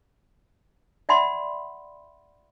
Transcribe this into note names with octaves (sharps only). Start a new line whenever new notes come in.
D5 E5 F#5 B5 C6